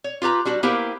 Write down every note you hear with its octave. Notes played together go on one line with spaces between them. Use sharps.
C#5
F4 G4 B4 A#5
G3 D4 F#4
A#3 B3 E4 G4 A#4 C5